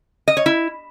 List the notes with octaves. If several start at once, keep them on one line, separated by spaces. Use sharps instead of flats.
D#5
C#5
E4